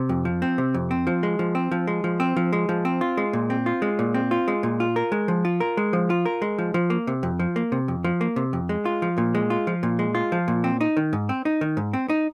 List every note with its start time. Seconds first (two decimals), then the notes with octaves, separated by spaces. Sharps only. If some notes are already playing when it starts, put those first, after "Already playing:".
Already playing: C3
0.09 F2
0.25 F3
0.42 C4
0.58 C3
0.74 F2
0.91 C4
1.07 F3
1.23 G#3
1.39 F3
1.55 C4
1.71 F3
1.87 G#3
2.04 F3
2.20 C4
2.37 F3
2.53 G#3
2.69 F3
2.85 C4
3.01 F4
3.17 G#3
3.33 A#2
3.50 C4
3.66 F4
3.82 G#3
3.99 A#2
4.14 C4
4.31 F4
4.48 G#3
4.63 A#2
4.80 F4
4.96 A#4
5.12 G#3
5.28 F3
5.45 F4
5.60 A#4
5.77 G#3
5.93 F3
6.10 F4
6.26 A#4
6.42 G#3
6.58 F3
6.74 F3
6.90 A#3
7.07 C3
7.23 F2
7.39 F3
7.56 A#3
7.72 C3
7.88 F2
8.04 F3
8.21 A#3
8.36 C3
8.53 F2
8.69 G#3
8.85 F4
9.02 F3
9.18 A#2
9.35 G#3
9.50 F4
9.67 F3
9.83 A#2
9.99 G#3
10.15 F4
10.32 F3
10.48 A#2
10.64 C4
10.81 D#4
10.97 D#3
11.13 G#2
11.29 C4
11.45 D#4
11.61 D#3
11.77 G#2
11.93 C4
12.10 D#4